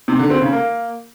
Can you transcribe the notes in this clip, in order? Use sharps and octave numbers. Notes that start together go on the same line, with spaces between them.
C3
D3
C4
C#3
A#3